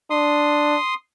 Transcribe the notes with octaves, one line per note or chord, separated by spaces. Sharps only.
D4 C6 D#6